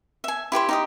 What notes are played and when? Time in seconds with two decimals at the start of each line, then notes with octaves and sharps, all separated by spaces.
0.24 E5 G#5
0.52 E4 G4 B4 C5
0.69 D#4 G4 D#6